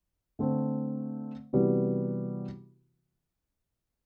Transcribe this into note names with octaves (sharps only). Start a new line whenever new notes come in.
D3 A3 C4
C3 E3 G3 B3 F#4